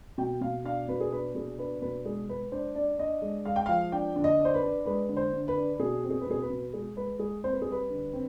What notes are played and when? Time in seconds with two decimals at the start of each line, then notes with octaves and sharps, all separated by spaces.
0.18 B2 G5
0.41 B2 F5
0.64 D4 F5
0.88 B2 B4
1.00 G#4
1.11 D4 B4
1.35 B2 G#4
1.58 D4 B4
1.82 B2 B4
2.05 G#3 G#4
2.28 G#3 B4
2.52 D4 C5
2.75 D4 D5
2.99 D4 D#5
3.22 G#3
3.45 G#3 F5
3.56 G5
3.66 F3 F5
3.92 D4 G5
4.16 D3
4.24 D#5
4.40 D4
4.45 C5
4.54 B4
4.63 D4
4.86 G#3 B4
5.09 D3
5.17 C5
5.33 D3
5.48 B4
5.56 D4
5.80 B2 G#4
6.04 C4
6.10 G#4
6.21 B4
6.27 B2 G#4
6.42 B4
6.50 B2
6.73 G#3 G#4
6.96 G#3 B4
7.19 G#3 G#4
7.44 C4 C5
7.52 B4
7.62 G#4
7.67 G3 B4
7.90 D3
8.13 C4